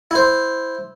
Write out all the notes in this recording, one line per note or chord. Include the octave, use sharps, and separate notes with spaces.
E4 C5